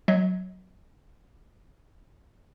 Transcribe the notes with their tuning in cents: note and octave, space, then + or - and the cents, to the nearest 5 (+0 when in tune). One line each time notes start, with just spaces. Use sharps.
F#3 +0 D#5 +30